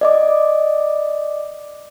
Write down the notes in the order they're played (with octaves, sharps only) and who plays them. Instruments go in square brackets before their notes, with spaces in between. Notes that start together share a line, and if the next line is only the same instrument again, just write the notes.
[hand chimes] D5 D#5 D6